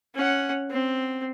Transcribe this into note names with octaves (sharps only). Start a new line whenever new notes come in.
C#4 F#5
C4